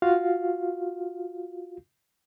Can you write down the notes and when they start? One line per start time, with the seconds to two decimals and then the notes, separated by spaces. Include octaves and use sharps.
0.02 F4 F#4 F5